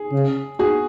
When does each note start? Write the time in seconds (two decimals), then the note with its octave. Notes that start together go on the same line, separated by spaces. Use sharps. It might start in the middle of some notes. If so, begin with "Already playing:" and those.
Already playing: G#4
0.12 C#3
0.59 F#4 G#4